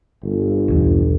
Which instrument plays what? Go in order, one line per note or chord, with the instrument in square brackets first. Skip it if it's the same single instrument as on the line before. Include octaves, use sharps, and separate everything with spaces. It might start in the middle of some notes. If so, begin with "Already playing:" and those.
[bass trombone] G1
[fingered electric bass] B1 E2